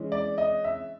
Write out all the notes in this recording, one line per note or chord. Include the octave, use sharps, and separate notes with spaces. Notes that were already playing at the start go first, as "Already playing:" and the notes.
Already playing: E3 G#3 C#4
D5
D#5
E5